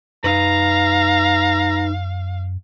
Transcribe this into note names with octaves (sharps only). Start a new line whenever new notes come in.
F#2 D#4 B4 F5 A#5